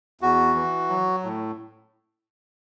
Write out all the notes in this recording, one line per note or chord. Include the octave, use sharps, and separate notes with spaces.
E2 F#4
E3
F#3
A2